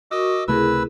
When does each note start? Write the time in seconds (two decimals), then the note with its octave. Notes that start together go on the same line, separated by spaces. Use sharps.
0.11 F#4 A#4 D#5 C#6 D6 E6
0.48 C#2 C3 A3 E4 G#4 A#4 B4 E6